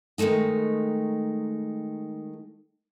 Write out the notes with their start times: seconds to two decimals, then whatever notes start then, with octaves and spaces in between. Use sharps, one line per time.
0.18 D#3 E3 G#3 A3 D#4